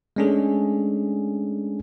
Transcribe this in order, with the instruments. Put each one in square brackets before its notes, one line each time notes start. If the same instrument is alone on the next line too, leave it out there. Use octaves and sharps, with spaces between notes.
[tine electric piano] G#3 A3 C#4 D4 G#4 A4